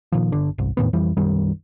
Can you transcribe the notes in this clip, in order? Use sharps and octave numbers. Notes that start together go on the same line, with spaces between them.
A#2 D#3 F3
G1 D3 D4
G1 C2
E2 A2 D#3 B3
F2 E3 G3
B1 F#2 D#3 G3